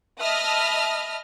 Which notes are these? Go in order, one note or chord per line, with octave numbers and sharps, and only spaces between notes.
D#5 E5 A5 B5 D#6 F6